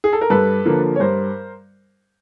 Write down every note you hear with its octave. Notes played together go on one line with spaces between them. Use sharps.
G#4
A4
A#4
G2 A4 B4
D3 F3 A#3
C#5
G2 A#4 C5